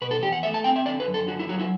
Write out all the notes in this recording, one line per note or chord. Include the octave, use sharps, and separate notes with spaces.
B2 B4
A4
E2 G4
F#5
A3 E5
A5
C4 G5
E5
D3 D5
B4
F#2
A4
D3 F#4
E4
F#3 F#4
E4